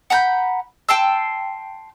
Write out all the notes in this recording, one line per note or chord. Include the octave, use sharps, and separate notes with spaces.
F#5 A#5 B5 G6
G5 A5 C6 E6